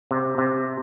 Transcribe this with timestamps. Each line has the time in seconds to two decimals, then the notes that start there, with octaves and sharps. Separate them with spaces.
0.11 C3
0.38 C3